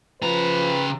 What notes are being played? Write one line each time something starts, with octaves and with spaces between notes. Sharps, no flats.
C#3 F3 B4 A#5